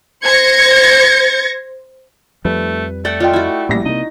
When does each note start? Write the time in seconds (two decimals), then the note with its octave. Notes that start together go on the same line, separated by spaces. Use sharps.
0.24 C5 G#6 A#6 C#7
2.45 F2 F3 G3 A3 B4
3.05 A3 D5 F#5 G5
3.20 F4 D5 D#5 G5
3.33 E4 F#4
3.69 A#1 A2 G3 A#6
3.85 C3 A#3 D#4 D#5